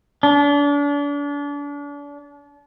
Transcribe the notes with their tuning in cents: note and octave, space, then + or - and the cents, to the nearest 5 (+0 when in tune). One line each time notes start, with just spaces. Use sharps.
D4 -35